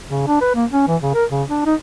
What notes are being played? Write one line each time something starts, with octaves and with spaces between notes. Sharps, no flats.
C#3
D4
B4
A#3
C#4
E3
C#3
A#4
C#3
D4
D#4